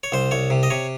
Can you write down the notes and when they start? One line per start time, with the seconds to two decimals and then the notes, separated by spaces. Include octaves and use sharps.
0.03 C#5
0.12 C2 C5
0.31 C2 C#5
0.50 C3
0.63 D#5
0.70 C3 C#5